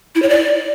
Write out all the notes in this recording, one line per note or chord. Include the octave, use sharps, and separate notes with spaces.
E4
C#5
D5